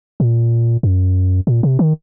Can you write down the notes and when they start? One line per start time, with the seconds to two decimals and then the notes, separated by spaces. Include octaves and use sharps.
0.20 A#2
0.83 F#2
1.47 A#2
1.63 C3
1.79 D#3